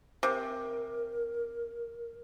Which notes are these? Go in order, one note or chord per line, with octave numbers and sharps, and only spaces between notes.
C3 A#4